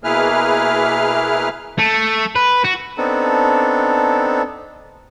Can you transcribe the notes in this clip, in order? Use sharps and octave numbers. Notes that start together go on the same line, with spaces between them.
B2 A#3 E4 G#4 B4 F6
A3
B4
F#4
B3 C4 D4 D#4 A4